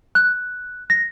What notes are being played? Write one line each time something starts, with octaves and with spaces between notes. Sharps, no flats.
F#6
A#6